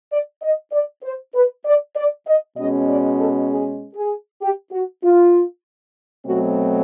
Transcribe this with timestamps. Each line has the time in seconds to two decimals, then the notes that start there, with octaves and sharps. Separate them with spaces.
0.11 D5
0.42 D#5
0.72 D5
1.04 C5
1.35 B4
1.65 D5
1.96 D5
2.27 D#5
2.57 B2 G#3 C#4 D#5
2.88 D5
3.19 A4
3.50 G#4
3.95 G#4
4.42 G4
4.72 F#4
5.04 F4
6.26 B2 F#3 A3 C4 F#4